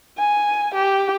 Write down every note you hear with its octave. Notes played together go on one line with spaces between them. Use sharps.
G#5
G4